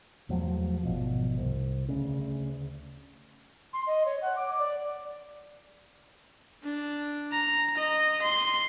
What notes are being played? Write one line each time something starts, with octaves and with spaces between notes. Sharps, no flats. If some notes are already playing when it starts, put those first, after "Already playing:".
E2 F3 F#3 A3
G#1 B2 F3
C2
D2 C#3
C6
D#5
C#5
F#5
D6
D5
D4
A#5
D#5
C6